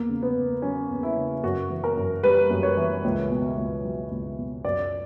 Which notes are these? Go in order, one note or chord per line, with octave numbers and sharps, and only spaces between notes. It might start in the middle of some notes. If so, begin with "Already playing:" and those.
Already playing: E2 A#3
C#3
B3
E2
F#3 C#4
E2
E4
C#3
F#2 F#4
E3
A#4
F#2
G3 B4
F#2
C#5
E3
C#2
B2
C#2
F#3
C#2
B2
F#2 D5